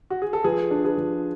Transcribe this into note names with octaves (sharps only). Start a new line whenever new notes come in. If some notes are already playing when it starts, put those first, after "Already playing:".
F#4
G#4
A4
F3 G#4 B4
D4
G#4 B4
F3